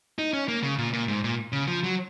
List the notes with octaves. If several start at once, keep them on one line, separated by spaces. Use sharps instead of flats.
D#4
C#4
A#3
C#3
A#2
A#2
G#2
A#2
C#3
F3
F#3